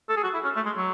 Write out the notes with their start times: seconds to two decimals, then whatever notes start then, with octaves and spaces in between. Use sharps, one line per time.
0.09 A4
0.17 G#4
0.23 F#4
0.34 E4
0.44 C#4
0.56 A3
0.66 G#3
0.77 F#3